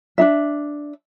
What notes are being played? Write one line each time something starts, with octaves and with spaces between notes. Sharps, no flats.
D4 D#4 E5